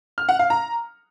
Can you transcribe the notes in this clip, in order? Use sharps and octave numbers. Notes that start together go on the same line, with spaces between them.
F6
F#5
F5
A#5